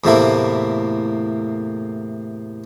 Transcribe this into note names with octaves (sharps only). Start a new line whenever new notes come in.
E2 A2 C3 A3 A#3 E4